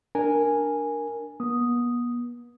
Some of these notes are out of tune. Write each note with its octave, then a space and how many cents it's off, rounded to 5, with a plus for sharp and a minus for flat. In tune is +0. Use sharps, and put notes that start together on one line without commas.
D4 +0 A#4 +0 G#5 -5
B3 -40 D#6 +0